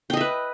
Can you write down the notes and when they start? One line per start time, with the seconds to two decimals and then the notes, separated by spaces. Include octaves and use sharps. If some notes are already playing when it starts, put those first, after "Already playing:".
0.10 G5
0.13 D#5
0.17 E5
0.21 B4